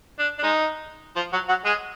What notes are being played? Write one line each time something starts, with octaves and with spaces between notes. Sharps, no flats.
D4
D4
G#3 D#4
F3 F4
F#3 F#4
F#3 F#4
G#3 G#4